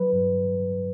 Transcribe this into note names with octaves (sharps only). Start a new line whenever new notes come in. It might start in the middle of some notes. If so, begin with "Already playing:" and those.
Already playing: F#3 B4
G2